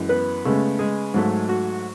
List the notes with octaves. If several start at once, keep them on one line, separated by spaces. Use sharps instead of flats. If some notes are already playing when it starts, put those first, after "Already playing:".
Already playing: F#2 E3 G#3
B3 B4
C#3 G#3 A3 B3 A4
G#3 G#4
G#2 F#3 A3
F#4